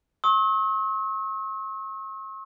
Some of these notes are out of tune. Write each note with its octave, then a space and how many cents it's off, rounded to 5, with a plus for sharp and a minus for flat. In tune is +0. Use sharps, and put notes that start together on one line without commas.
C#6 -45 E6 -45